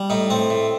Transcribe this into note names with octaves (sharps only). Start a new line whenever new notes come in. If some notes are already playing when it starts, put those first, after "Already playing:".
Already playing: G3
A2 D#4
A2 C4
A2